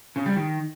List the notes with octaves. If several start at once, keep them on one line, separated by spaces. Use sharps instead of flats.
C#3
G3
D#3